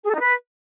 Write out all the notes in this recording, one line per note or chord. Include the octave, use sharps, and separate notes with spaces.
G#4
A4
D#4
B4